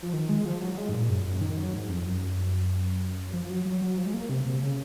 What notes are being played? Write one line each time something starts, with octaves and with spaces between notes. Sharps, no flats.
F3
D#3
G#3
F3
F#3
G#3
G#2
A#2
F#2
F#2
D#3
F#3
G#2
F2
F#2
F3
F#3
F#3
F#3
F3
G#3
A#3
C3
C3
C#3